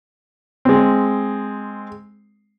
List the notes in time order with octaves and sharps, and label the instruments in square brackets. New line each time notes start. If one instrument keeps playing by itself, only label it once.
[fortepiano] G#3 C4